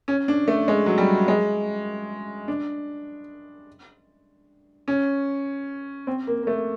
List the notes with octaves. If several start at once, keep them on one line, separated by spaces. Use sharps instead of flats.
C#4
D4
A3
G#3
F#3
G3
G#3
D4
C#4
C4
A#3
A#3
A3